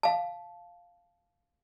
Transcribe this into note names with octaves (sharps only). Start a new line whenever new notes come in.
F5 A5